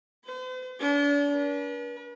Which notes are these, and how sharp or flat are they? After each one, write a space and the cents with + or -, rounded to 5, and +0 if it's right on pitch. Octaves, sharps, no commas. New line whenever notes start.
C5 -45
D4 -40
B4 -40